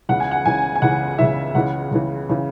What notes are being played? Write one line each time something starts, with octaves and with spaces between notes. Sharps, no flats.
C#2 C#3 E3 F#5
G#5
F#5
C#2 C#3 E3 G#5
G#5
C#2 C#3 E3 F#5
C#2 C#3 E3 E5
C#2 C#3 E3 F#5
C#2 C#3 E3
C#3 E3